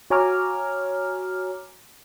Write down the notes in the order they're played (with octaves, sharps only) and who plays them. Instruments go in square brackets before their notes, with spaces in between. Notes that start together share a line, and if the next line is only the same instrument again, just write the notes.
[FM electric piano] F#4 C#5 G#5 A#5 D6 F6